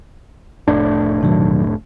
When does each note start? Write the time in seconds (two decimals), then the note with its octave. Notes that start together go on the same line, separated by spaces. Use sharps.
0.68 F1 A2 D4
1.21 B2 D#3 F#3